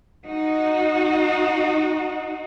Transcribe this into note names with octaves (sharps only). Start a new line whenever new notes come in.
D#4 F#4